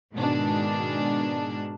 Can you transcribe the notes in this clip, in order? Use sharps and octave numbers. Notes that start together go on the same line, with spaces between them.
G#2 B2 D#3 D4 G#4